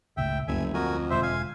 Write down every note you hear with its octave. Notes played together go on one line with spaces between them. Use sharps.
G1 C#2 A2 E5 G5
F#1 D2 G2 E5 G#5
F2 F#4 A#4 G#5
E1 D3 G#3 C5 E5
F5 G#5